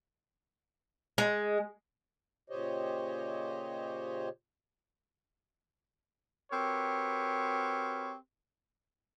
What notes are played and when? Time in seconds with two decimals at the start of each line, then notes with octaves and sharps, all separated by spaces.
1.18 G#3
2.50 A#2 C#3 G4 C5 C#5 D#5
6.52 C4 F#4 G4 A#4 B4 C#5